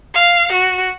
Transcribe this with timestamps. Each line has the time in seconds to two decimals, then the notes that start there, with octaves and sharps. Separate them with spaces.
0.14 F5
0.52 F#4